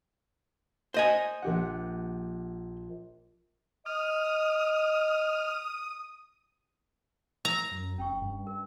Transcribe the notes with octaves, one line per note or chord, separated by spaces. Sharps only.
C5 D#5 G#5
A#1 G4 F#5
D#5 D#6 F6
A#4 A#5
F#2
F1 C#4 G5 C#6
G2
A#4